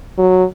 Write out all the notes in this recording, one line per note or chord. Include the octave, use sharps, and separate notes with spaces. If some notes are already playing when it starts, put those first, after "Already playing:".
F#3